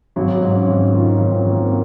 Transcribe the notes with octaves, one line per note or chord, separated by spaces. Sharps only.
G#1 F#3
G#2
C#4
G#1
D#3 F4
D#4
C#4
G#1
C4
G#1
A#3